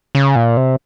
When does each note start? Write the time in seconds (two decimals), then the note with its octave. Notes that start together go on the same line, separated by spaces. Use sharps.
0.15 C#3
0.36 A#2
0.57 C3